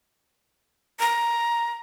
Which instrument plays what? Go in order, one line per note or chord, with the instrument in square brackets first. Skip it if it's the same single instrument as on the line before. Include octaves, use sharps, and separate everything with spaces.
[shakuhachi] A#5